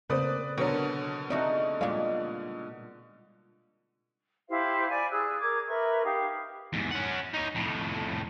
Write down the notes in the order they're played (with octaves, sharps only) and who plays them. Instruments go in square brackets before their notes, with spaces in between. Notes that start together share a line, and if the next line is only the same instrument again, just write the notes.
[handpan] C#3 C4 [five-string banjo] A3 A#3 C5 [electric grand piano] B4 D5 D#6
[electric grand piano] B2 D3 [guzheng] F#3 [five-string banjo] A#4 B4 C#5
[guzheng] A3 D#4 F#4 [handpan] C4 [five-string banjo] G#4 D5
[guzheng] A#2 G#3 [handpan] G3 D5 [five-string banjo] F5
[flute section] E4 G4 C5 F5
D5 G#5 B5 D6
G#4 E6 F#6
A#4 D6 G#6
A#4 B4 E5 C#6
D#4 G4 F5
[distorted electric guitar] E2 G#2
C#4 F#5
D#4 C#5
F2 A2